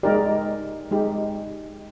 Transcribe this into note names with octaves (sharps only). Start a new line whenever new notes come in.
G#3 D#4 G4 A#4 D5
G#3 D#4 G4